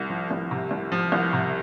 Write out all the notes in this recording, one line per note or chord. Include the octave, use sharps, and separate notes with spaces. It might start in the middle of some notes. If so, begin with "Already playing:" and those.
Already playing: C2
F3
C2
C3
C2
F3
C2
C3